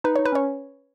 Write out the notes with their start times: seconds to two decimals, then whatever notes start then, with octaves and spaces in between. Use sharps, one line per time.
0.04 D#4 B4
0.16 D#4 C#5
0.25 B4
0.32 C#4 C#5